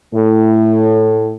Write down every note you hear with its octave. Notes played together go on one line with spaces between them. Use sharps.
A2